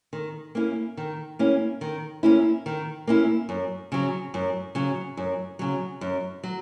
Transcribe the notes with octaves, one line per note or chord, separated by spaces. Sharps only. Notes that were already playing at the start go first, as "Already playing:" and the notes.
D#3
A#3 C#4 E4
D#3
A#3 C#4 E4
D#3
A#3 C#4 E4
D#3
A#3 C#4 E4
F#2
C#3 F#3
F#2
C#3 F#3
F#2
C#3 F#3
F#2
F#3